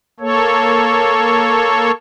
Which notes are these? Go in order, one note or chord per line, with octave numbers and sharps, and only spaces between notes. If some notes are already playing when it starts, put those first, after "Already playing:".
A#3 A4 C#5